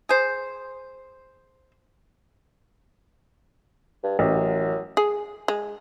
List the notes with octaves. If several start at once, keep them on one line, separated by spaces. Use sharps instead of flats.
G#4 C5
G2
A1 F#2
G#4
G#3